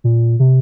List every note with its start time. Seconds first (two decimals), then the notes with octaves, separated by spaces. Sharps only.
0.04 A#2
0.40 C3